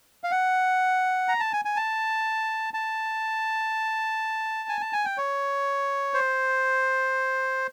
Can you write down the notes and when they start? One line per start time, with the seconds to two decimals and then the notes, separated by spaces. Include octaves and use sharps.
0.24 F5
0.31 F#5
1.28 A#5
1.40 A5
1.53 G#5
1.65 G#5
1.76 A5
2.74 A5
4.69 G#5
4.81 A5
4.93 G#5
5.05 G5
5.18 C#5
6.14 C5